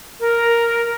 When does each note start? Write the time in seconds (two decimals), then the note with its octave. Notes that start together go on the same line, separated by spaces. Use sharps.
0.20 A#4